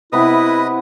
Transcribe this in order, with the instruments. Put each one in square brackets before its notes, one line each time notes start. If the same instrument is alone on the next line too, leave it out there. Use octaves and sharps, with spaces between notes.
[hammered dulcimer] C3 B3 [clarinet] E4 [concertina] B4 D#5 D#6